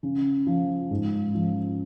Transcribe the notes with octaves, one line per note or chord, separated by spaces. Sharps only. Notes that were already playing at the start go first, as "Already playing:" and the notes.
C#3
F3
G#2
F3